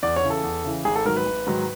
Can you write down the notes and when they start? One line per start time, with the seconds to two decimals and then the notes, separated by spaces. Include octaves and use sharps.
0.03 E2 D5
0.16 C#5
0.23 C#3 E3
0.30 A4
0.44 E2
0.64 C#3 E3
0.85 G#1 G#4
0.96 A4
1.05 G#2 D#3 F#3 A#4
1.16 B4
1.26 G#1
1.47 G#2 D#3 F#3